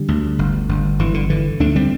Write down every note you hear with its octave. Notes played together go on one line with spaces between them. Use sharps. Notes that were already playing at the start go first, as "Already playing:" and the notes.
Already playing: D3 G3
D2
G1
G1
G1 E3
D3
D3 E3
D2 A3 D4
G3 C4